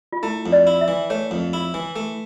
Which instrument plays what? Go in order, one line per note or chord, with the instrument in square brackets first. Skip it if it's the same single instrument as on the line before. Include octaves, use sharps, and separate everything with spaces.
[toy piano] F4
[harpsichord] A3 [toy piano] E4
[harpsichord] F2
[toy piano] D5
[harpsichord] E4
[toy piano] E5
[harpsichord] E3
[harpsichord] A3 [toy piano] C#5
[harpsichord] F2
E4
E3
A3